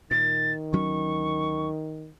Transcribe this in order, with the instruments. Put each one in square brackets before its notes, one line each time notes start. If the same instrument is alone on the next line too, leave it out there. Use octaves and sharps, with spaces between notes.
[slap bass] A#2 [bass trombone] D#3 [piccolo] A6
[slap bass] D2 F#3 C#4 [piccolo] C#6